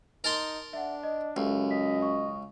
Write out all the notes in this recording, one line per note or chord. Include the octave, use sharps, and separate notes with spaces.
D#4 A#4 A5 C6
D4 E5 F#5
D#5
C#2 F#2 G4 A4 E5
D#5 B6
C#6